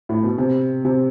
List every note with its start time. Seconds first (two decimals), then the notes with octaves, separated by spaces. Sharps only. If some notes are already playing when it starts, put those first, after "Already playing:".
0.09 A2
0.23 B2
0.38 C3
0.85 C3